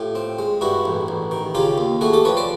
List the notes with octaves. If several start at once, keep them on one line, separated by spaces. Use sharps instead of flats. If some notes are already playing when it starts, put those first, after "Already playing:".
Already playing: A2 F4 G4
C4
G#3
G2 E4 F#4
A1
A1
D#3
C#3 F4 G4
D#2
A3 F#4 G#4
G4 A4
F3 B4 C#5
C5 D5